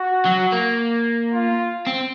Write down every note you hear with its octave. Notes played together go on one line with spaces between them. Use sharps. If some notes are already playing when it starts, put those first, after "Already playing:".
Already playing: F#4
F#3
A#3
F4
C4